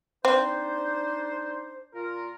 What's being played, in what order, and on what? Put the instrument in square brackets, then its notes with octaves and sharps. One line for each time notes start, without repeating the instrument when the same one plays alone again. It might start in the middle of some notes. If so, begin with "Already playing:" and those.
[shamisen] C4 [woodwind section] D4 D#4 C5
[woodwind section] A#2 F4 A#4